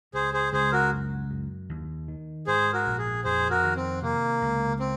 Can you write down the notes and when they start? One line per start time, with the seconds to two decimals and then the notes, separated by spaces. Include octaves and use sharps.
0.13 C#2 G#4 C5
0.33 G#4 C5
0.52 C#2 G#4 C5
0.72 F#4 A#4
0.92 F#2
1.30 F#2
1.69 D#2
2.08 D#3
2.47 G#2 G#4 C5
2.73 F#4 A#4
2.86 A#1
2.98 G#4
3.24 F2 G#4 C5
3.50 F#4 A#4
3.64 D#3
3.76 C4
4.03 C3 A#3
4.42 C#2
4.80 C4